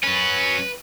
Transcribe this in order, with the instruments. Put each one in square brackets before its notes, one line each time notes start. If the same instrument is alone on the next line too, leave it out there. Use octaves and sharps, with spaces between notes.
[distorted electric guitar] F#3 C#4 [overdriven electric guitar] B4